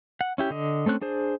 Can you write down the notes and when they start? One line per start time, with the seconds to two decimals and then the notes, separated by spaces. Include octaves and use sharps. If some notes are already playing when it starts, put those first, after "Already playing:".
0.21 F#5
0.38 C#4 E4 G4
0.50 D3 D#5
0.86 A3 C4 C#4 F#6
1.01 D4 G#4 C5